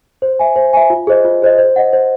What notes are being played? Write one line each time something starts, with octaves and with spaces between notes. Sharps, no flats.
C5
E5 G#5
C5
E5 G#5
F4
G#4 C5 D#5
F4
G#4 C5 D#5
C5
D#5 F#5
C5